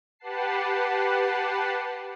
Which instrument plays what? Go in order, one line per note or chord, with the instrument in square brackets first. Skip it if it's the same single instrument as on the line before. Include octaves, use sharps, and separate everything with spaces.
[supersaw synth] G4 B4 F#5 A5 C7